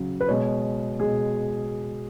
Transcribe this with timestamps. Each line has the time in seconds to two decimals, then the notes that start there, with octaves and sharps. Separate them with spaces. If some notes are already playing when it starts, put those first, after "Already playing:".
Already playing: C#3 F#3
0.21 B4
0.28 B2 G#3 C#5
1.00 B2 G#3 G#4